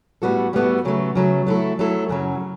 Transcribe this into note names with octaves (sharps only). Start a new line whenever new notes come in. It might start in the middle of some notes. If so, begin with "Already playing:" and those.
A2 G3 B3 F#4 A4
A2 G3 B3 F#4 A4
C#3 F#3 A3
C#3 F#3 A3
F#3 A3 E4 A4
F#3 A3 E4 A4
F#2 C#3 F#3